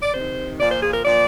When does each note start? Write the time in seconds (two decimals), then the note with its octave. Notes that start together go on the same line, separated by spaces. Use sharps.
0.03 D5
0.14 C3 D#3 C5
0.60 A#2 F3 D5
0.72 C5
0.83 G#4
0.94 A#4
1.05 A#2 F3 D5